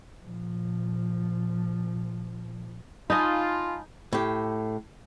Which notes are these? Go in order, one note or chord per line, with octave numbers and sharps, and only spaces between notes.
A#2 F3
D#4 F4 D#5 G#5 A5 B5
A2 G4